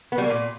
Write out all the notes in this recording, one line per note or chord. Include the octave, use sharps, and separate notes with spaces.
B3
G3
A#3
A#2